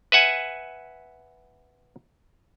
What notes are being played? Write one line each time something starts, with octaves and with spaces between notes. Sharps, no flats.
B4 E5 F#5 G#5